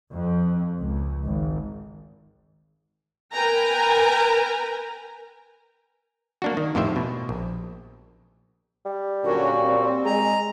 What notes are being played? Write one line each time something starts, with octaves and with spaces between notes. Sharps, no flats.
F2
C#2
G#1
A#4 B4 G5 G#5 A#5
A#3 D4 F#4
D#3
F2 A2 D#3 G4 C5 E5
B2
A#1
G3
A#2 D3 F#3 C#4 F#4
C4
G#3 G#4 A#5